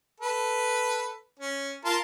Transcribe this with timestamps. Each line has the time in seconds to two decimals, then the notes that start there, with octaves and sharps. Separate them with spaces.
0.20 A4 B4
1.40 C#4
1.85 F4 A#4 A5